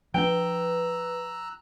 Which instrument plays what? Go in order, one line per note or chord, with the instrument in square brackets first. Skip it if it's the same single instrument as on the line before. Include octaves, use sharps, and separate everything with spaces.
[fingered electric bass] F3 C4 D4 [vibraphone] B4 [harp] G5 [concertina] A#5 E6 F#6